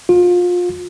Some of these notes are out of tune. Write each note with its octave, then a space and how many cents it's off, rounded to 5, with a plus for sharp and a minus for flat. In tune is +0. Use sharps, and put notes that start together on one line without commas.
F4 +30